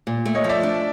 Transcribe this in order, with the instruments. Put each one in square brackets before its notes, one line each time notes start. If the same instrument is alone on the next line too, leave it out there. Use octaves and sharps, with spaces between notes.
[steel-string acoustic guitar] A#2
A3
[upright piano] C#5 D#5
[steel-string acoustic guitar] F3
[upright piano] D5 E5
[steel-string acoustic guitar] D4